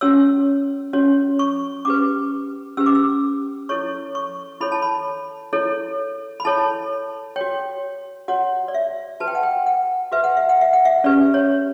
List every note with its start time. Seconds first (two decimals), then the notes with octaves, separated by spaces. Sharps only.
0.01 C#4 F#4 C#5 E6
0.93 C#4 F#4 C#5
1.39 C#6
1.85 C#4 G4 B4 D6
2.77 C#4 G4 B4 E6
2.86 D6
2.95 E6
3.69 E4 A4 C#5 C#6
4.15 C#6
4.61 E4 A4 C#5 B5
4.72 A5
4.82 B5
5.53 E4 A4 C#5
6.40 B5
6.45 E4 A4 C#5 A5
7.36 F#4 C#5 G5
8.28 F#4 C#5 F#5
8.68 D5
8.74 E5
9.20 F#4 B4 A5
9.28 G5
9.35 F#5
9.43 G5
9.66 F#5
10.12 F#4 B4 E5
10.24 F#5
10.37 E5
10.49 F#5
10.61 E5
10.73 F#5
10.85 E5
11.04 C#4 G4 B4 D5
11.34 C#5